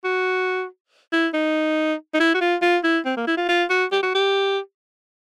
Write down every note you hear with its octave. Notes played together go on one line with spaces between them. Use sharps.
F#4
E4
D#4
D#4
E4
F#4
F4
F4
E4
C4
A#3
E4
F4
F4
F#4
G4
F#4
G4